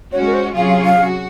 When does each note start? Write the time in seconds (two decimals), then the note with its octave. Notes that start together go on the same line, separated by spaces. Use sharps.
0.12 G#3 C#4 F#4 C#5
0.26 A#4
0.34 C5
0.56 C3 F#3 C#4 F4 G#4 F5
0.70 F5
0.85 F5
0.99 F#4